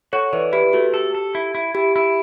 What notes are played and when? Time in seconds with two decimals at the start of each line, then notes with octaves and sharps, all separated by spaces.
0.13 F#4 A4 C#5
0.33 E3 B4 D5
0.53 E4 G4 B4
0.73 A3 F#4 A4
0.94 G4 A4
1.15 A4
1.35 E4
1.55 E4
1.74 E4 G4
1.96 E4